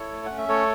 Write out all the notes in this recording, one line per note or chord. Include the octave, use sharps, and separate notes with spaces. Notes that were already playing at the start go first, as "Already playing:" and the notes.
Already playing: E4 A4 C#5
A3
C#4 F#5
E5
A3 A4 C#5